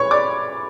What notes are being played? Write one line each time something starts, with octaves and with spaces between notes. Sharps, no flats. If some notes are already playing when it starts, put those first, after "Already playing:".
Already playing: B4 C#5 B5 C#6
D5 D6